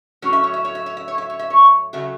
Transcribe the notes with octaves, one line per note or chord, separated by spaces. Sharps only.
A2 F#3 C#4 C#5
E5
C#5
E5
C#5
E5
C#5
E5
C#5
E5
C#5
E5
C#5
C#3 F#3 A3 E5